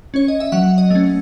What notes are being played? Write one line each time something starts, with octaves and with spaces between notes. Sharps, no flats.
C#4 C#5
D#5
E5
F#3 F#5
D#5
A3 C#4